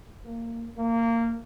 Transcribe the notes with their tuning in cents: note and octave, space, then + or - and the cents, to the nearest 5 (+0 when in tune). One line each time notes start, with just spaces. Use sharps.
A#3 -15
A#3 -20